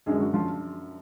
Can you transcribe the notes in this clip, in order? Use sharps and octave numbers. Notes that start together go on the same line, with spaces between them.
F#2 D3 G#3 G#4
F#3 F#4
F3 F4